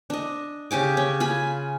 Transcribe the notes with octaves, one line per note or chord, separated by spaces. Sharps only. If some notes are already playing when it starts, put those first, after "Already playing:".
D4 D#5
C#3 G4 G#5 D6
C#4
F4 G#5 B5